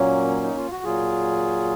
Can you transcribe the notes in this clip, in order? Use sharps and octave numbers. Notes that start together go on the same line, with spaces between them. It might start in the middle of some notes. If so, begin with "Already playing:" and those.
Already playing: A#2 F#3 A#3 C#4
D#4
F4
F#4
A#2 F#3 F4 G#4